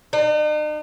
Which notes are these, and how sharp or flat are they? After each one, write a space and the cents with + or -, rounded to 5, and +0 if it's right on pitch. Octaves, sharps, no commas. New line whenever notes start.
D#4 -45